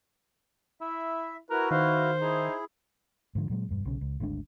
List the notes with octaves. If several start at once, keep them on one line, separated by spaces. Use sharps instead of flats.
E4 E5
E4 F#4 A#4 B4
D#3 C5 F5
D#4 E4 G#4
G#2 D3 F3
A#2 F#3 G#3
E1 G2
B1 C#3
C#2
G#1 D2 G#3 D4